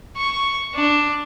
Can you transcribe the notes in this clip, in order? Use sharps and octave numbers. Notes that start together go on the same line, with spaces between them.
C#6
D4